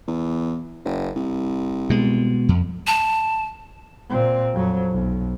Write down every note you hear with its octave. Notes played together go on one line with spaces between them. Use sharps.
E2
F#1
C2
B2 G#3
F2
A5
A#2 C4
F2 F#3
B1